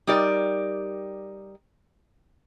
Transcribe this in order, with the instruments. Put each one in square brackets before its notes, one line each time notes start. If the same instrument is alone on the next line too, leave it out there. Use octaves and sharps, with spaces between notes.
[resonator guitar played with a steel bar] G3 D#4 G4 A#4 D5